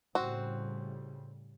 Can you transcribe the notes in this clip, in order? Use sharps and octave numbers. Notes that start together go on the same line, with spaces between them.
A2 C#3 G3 C4 F#4